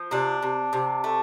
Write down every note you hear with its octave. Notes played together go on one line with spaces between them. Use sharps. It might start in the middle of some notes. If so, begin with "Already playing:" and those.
Already playing: F3
C3 D4
C3
C3
A3